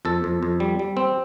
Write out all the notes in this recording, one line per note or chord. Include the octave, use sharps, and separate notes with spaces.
F2 A4
F2
F2
G3
G3
C4